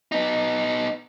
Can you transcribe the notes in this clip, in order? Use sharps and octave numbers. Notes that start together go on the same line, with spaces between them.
B3 D#4